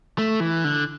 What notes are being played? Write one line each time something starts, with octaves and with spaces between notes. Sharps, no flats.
A3
E3
D3